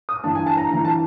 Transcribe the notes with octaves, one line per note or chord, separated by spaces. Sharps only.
D#6
G2 E3 A5
G#5
A5
A#5
G2 E3 A#5
A5